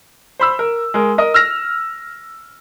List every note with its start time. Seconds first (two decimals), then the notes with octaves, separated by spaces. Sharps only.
0.39 C5 B5 E6
0.59 A#4
0.94 G#3 A#4
1.18 A#4 D#5
1.34 E6 F6 A#6